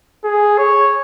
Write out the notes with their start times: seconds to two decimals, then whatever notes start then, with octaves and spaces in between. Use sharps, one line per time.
0.24 G#4
0.58 C#5